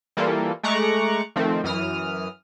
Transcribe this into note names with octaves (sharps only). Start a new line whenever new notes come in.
E3 G3 A#3 F4 A4
G#3 A3 A#5 C#6 D6 F#6
D#3 F3 A3 C4
F#2 E3 D#6 F6